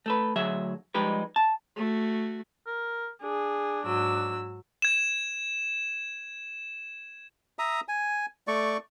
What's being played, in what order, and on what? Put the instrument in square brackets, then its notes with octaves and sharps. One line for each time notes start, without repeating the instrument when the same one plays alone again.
[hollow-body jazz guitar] A3 A4 B4
D2 F#3 G#4 E5
F3 G3 G#3 D#4 G4 B4
A5
[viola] A3 F#4
[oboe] A#4
[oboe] D4 [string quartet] G#4
[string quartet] G#2 F#3 E6
[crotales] G#6 E7
[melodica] E5 A#5 D#6
G#5
A3 D5 C#6